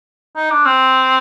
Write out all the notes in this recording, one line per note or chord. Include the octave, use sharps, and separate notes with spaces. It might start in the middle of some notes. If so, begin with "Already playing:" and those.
D#4
D4
C4